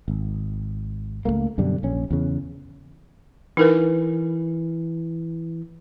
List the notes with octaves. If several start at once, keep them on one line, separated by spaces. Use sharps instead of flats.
G#1
C#2 F#2 A3 A#3
F#2 B2 D3 G3
A#1 C#4
E2 C#3
E3 D#4 A#4 B4